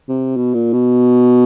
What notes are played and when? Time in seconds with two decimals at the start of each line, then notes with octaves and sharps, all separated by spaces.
0.09 C3
0.36 B2
0.54 A#2
0.73 B2